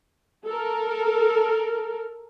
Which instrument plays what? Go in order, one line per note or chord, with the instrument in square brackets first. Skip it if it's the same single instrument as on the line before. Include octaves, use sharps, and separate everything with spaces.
[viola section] A4 A#4